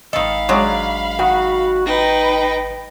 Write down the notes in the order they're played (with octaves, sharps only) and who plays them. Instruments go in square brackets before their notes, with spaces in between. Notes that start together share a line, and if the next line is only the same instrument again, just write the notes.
[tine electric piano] G#1 D#5 [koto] D#3 A4 [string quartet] F5 B5
[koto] F#3 G#3 D4
[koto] D#3 [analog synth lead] F#4
[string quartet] D#4 B4 G5 [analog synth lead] A#6